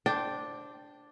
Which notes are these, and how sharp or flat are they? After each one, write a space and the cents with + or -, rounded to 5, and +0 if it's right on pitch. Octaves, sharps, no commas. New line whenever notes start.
D4 +0 C5 +25 G5 +0